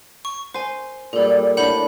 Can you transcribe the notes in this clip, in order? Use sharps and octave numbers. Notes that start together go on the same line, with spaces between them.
C#6
C5 G#5 C6
A#2 G3 G#4 A4
A2 D4 F#5 B5 G6